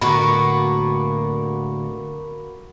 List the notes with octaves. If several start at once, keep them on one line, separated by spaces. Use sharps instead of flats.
A2 D3 A#3 B3 F#4 B5 C#6